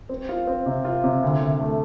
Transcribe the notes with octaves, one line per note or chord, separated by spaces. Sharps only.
C4
F4
C4
C3
F4
C3
D2
D2
A3